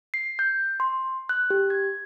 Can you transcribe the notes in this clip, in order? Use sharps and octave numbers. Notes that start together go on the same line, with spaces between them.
C7
G6
C6
F#6
G4
G#6